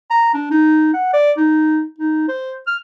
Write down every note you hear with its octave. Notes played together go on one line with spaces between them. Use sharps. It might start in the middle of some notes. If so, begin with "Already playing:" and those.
A#5
D4
D#4
F#5
D5
D#4
D#4
C5
F6